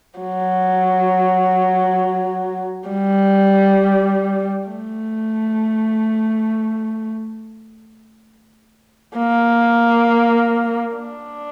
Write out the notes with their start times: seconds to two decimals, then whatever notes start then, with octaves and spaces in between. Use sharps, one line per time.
0.20 F#3
2.89 G3
4.68 A3
9.18 A#3
10.96 D4